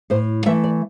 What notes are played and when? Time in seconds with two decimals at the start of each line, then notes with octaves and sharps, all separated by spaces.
0.10 A2 C5
0.46 E3 A3 E5
0.64 D5